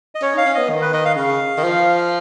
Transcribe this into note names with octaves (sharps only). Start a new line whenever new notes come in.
D#5
C#4 C#5
D#4 F5
C#4
B3 D#5
D#3
B4
D#3 D#5
F5
C#3 F5
D#3
F3